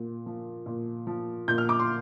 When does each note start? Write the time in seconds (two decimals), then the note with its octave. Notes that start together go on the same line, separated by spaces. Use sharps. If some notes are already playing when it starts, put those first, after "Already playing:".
Already playing: A#2
0.26 F3
0.66 A#2
1.07 F3
1.48 A#2 G6
1.58 F6
1.69 D6
1.79 C6